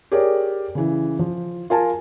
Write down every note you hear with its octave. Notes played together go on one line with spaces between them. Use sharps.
G4 G#4 A#4 C#5 D5
C#3 E3
F3
F4 A#4 G#5 A5